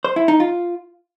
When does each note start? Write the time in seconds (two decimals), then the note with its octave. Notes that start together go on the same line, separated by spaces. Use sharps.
0.04 C5
0.16 E4
0.28 D#4
0.40 F4